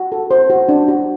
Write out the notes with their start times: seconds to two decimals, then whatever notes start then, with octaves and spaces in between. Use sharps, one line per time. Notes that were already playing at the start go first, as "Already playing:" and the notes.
Already playing: F#4
0.12 A4
0.31 C5
0.50 F#4
0.69 D4
0.88 F#4